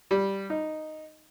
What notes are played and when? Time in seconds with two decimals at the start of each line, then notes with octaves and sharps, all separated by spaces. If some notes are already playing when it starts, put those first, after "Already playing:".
0.11 G3
0.50 D#4